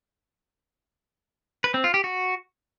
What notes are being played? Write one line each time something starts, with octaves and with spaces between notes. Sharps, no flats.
B4
C4
F4
G4
F#4